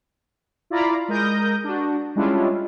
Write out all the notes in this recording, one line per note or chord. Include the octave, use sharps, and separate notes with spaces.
E4 F4 D5 F5 A#5 B5
G#3 A#4 D#6 G6 A#6
D4 F#4
G3 G#3 C#4 D4 E4 F4